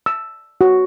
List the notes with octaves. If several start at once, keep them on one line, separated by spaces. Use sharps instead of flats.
E6
F#4